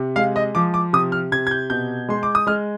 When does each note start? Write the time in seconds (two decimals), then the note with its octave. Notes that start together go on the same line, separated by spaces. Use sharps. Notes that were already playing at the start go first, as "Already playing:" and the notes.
Already playing: C3
0.16 G#3 F5
0.36 D#5
0.55 F3 D6
0.74 D6
0.93 C3 D#6
1.12 F6
1.32 C3 G#6
1.47 G#6
1.51 G6
1.70 B2 G6
2.09 G#3 C6
2.23 D6
2.35 D#6
2.47 G#3 F6